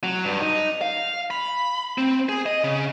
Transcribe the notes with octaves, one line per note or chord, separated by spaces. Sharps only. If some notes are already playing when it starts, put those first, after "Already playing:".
F#3
G2
D#4
F5
B5
C4
G#4
D#5
C#3